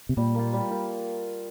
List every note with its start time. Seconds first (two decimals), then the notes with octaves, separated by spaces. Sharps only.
0.09 C3
0.17 A#2 G3
0.35 A#3 F4
0.53 G3
0.71 A#3 F4